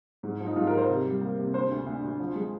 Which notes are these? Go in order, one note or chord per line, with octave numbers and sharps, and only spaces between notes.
G#2
F3
D#4
G#2 F4
A#4
F3
C5
C3
G3
A#3
C3
D3 C5
D2
D2
D2
F3
G#3